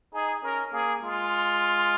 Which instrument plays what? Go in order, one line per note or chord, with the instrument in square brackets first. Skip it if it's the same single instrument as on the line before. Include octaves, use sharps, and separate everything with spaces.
[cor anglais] D#4 [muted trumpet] G#4
[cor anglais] C#4 [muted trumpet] A#4
[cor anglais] A#3 [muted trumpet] G#4
[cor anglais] G#3 [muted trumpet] F4